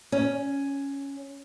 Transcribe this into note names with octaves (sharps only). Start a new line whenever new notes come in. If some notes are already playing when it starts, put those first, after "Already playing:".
C#4